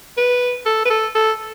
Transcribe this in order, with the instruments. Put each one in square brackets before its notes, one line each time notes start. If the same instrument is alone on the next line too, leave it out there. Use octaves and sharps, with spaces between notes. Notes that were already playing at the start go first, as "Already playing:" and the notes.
[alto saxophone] B4
A4
B4
A4
A4